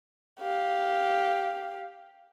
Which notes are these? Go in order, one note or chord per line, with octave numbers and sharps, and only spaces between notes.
G4 F5